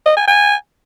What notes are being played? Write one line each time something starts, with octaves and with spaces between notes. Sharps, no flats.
D#5
G#5
G#5